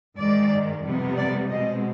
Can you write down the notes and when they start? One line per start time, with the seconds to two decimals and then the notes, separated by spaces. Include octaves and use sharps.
0.17 G#2 D#3 G#3 D5
0.83 F2 C3 G3 B3
1.17 D5
1.49 B2 G#3 C4 D#5